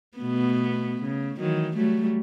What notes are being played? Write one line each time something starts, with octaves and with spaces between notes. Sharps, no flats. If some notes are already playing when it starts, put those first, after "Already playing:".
B2 A3 B3
C#3
D#3 E3 F#3
F#3 G3 A3